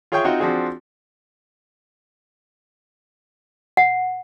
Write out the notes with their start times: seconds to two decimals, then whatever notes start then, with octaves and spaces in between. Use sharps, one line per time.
0.12 F4 G#4 C#5 E5 G5 C#6
0.24 C4 D#4 F4 F#4 F#5 G5
0.40 F3 C4 D4 F#4 G#4
3.77 F#5